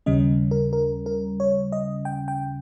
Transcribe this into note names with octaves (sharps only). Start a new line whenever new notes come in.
D#2 C#3 G3 C#4 D#5
A#4
A#4
A#4
C#5
D#5
G5
G5